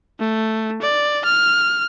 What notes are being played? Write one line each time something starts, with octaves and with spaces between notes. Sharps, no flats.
A3
D5
F6